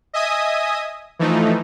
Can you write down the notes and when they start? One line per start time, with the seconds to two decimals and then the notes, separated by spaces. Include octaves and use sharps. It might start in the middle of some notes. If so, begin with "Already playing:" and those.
0.14 D#5 E5 G#5 D#6
1.19 E3 F3 A3 D#4